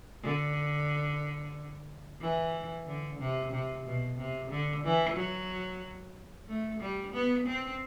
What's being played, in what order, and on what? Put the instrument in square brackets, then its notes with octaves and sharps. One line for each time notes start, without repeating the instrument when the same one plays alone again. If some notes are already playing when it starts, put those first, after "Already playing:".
[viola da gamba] D3
E3
D3
C3
C3
B2
C3
D3
E3
F#3
A3
G3
B3
C4